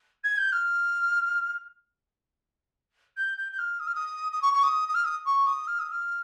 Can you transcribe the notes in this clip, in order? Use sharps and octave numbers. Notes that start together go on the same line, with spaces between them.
G#6
G6
F6
G6
G6
G6
F6
D#6
F6
D#6
D#6
C#6
C#6
D#6
D#6
F6
D#6
C#6
D#6
F6
D#6
F6